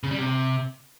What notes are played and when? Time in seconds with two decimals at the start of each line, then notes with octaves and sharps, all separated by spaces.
0.03 C#3
0.11 G3
0.18 C3